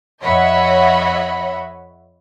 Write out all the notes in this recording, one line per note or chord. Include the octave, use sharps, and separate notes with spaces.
F2 C#5 D#5 E5 F#5 B5